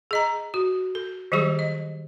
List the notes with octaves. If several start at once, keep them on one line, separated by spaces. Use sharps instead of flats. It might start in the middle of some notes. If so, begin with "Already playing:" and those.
G#4 D#5 A#5
F#4
A4
D#3 F#3 G3 G4 G#4 C#6
D#5